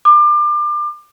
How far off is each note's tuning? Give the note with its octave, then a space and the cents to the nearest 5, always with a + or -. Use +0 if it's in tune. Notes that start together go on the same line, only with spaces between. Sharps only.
D6 +30